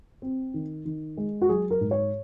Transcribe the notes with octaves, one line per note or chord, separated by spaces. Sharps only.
C4
D#3
D#3
G#3
F#4
F#3 G#4
A#4
G#2
C#5